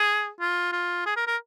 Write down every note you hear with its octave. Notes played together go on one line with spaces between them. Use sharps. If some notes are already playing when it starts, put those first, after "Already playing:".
Already playing: G#4
F4
F4
G#4
A#4
A#4